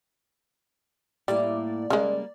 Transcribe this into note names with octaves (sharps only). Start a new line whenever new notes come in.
A2 G3 A#3 E4 D5
C#3 G3 G#3 A#3